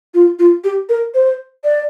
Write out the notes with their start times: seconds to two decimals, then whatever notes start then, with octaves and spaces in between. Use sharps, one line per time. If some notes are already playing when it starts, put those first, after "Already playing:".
0.15 F4
0.39 F4
0.64 G4
0.89 A#4
1.14 C5
1.64 D5